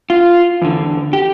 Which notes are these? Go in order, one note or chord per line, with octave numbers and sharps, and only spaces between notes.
F4
E2 D3
G4